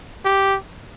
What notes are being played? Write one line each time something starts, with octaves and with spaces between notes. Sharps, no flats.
G4